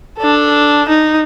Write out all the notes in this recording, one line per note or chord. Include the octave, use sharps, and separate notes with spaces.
D4 A4
D#4